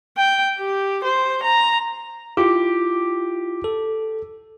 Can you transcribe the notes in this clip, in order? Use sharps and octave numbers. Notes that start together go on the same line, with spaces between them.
G5
G4
C5
A#5
E4 F4 G4
A4